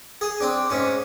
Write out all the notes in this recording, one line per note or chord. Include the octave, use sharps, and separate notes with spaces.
G#4
C4 D4
G#2 C#4